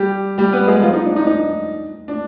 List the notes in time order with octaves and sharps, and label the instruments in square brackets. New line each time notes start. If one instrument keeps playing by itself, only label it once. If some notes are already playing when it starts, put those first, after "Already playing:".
Already playing: [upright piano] G3 G4
G3 G4
B3 B4
G#3 G#4
F3 F4
D#4
D4
D#4
D#4
D4